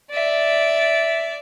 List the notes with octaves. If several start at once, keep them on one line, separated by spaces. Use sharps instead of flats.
D5 E5